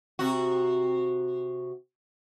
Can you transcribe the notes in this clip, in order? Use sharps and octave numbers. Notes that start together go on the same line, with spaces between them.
C3 F#4